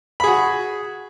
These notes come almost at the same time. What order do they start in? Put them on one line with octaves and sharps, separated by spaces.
B5 G#4 F#4